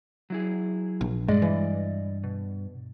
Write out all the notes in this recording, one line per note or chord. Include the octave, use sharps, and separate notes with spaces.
F#3 E4 G#4
A#1
G2 G#3 D5 D#5
E3
B2